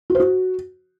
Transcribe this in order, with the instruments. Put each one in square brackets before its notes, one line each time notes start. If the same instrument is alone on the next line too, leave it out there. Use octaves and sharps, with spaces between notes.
[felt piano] F#4
C5
F#4